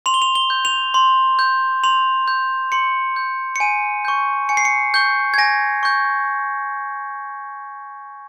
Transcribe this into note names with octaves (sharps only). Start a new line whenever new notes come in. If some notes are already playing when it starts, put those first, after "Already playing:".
C6 F7
G7
F7
G7
G6
F7
C6
G6
C6 F7
G6
C6 C#7
G6
C#7
G#5 D#7
C#6 G6
G#5 C#7
C7
C#7
C#6 G6
G#6
G#5 A#6
C#6 G6